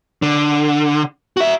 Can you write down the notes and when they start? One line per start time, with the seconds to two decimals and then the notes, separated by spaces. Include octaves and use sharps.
0.22 D3
1.37 F#4 E5